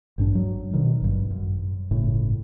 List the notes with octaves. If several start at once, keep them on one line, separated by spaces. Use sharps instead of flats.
A1 G2 D4
F#3
B2 D#3
G#1 G2
F#2
G1 A2 C#3